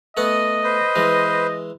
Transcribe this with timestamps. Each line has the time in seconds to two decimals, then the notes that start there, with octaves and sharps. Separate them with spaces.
0.17 A3 B3 D#5 F#5
0.64 B4 C5
0.96 E3 G#3